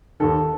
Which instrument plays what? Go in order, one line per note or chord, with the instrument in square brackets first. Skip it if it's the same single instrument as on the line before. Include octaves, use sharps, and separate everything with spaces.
[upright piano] D#2 D#3 A4